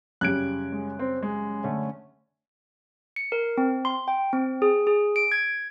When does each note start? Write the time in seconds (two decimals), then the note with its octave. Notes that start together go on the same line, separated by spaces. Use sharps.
0.21 F#2 C#3 G3 F#6 G#6 D7
0.72 G#3
0.99 C4
1.23 G#3
1.64 D3 A3 C#4
3.16 C#7
3.32 A#4
3.58 C4
3.85 C6
4.08 G5
4.33 C4
4.62 G#4
4.87 G#4
5.16 D7
5.32 G#6